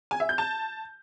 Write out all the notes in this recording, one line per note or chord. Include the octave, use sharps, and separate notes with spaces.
G#5
E5
G6
A5